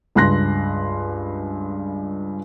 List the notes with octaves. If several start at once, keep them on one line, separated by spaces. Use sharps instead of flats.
C#2 G2 C6 F#6 A#6